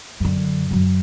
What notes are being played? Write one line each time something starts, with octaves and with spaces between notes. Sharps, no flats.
F#2 D3
F#2 F#3